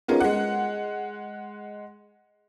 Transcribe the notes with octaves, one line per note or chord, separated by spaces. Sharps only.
B3 C#4 D#4 F4 G#4 A#4
G#3 F#5